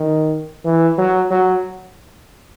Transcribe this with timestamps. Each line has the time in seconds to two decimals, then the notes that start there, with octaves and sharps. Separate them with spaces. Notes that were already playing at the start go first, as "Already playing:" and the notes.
Already playing: D#3
0.64 E3
0.98 F#3
1.31 F#3